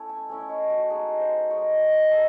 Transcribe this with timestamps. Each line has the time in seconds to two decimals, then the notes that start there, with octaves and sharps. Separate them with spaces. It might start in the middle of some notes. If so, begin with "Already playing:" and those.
Already playing: A3 C#4 E4
0.09 G#5
0.29 A3 C#4 E4 G#5
0.41 D#5
0.49 C#5
0.70 F#4
0.90 G#3 D#4 G#4
1.20 C5
1.50 G#3 D#4 C#5
1.81 D#5
2.11 A3 D#4 E5